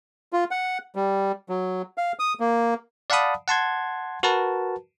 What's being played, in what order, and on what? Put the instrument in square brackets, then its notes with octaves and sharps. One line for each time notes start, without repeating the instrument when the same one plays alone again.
[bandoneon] F4
F#5
G3
F#3
F5
D#6
A#3
[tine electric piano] D5 F5 F#5 A5 B5 D#6
F#5 A5 C6 G#6
F#4 A#4 B4 A5